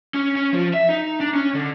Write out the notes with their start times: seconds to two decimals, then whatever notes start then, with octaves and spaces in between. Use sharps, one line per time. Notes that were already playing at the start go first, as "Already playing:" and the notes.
0.14 C#4
0.36 C#4
0.53 F3
0.74 E5
0.89 D#4
1.21 D4
1.35 C#4
1.55 D3